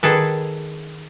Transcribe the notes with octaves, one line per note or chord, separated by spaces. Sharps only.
D#3 G#4 A4 B4